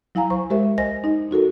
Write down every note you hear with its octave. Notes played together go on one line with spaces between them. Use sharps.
F#3 E4 F5 G#5 A#5
C5 C#6
G#3 G4 A#4 C5 E5
C5 D#5 G#5 A#6
D#4 D#5
D#4 F#4 A4 A#4